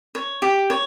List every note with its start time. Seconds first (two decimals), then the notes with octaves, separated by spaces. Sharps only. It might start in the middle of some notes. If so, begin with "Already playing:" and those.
0.15 C#5
0.42 G4
0.70 C#5